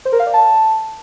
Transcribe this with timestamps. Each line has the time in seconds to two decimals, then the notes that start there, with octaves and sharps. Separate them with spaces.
0.05 C5
0.12 A#4
0.19 F5
0.26 D5
0.33 A5